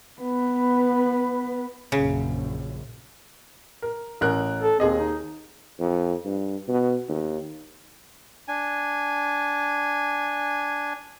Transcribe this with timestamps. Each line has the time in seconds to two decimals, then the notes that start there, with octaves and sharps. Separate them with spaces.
0.21 B3 B4
1.92 A#1 F#2 C#3
3.82 A#4
4.21 A1 A#4 F#6
4.61 A4
4.80 D#2 C4 G#4 D#5
4.99 D#4
5.79 F2
6.25 G2
6.68 B2
7.08 D#2
8.48 D4 G#5